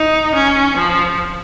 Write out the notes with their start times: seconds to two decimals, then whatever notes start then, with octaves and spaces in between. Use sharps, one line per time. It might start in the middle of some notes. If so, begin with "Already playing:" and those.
Already playing: D#4
0.35 C#4
0.77 F3